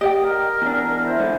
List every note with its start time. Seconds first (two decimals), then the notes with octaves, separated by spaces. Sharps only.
0.01 G4 D5 D#5 G5
0.21 A#4
0.62 E2 D4
1.03 E4 C5
1.19 G#2 D3